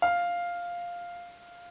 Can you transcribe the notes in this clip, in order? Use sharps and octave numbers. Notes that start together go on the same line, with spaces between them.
F5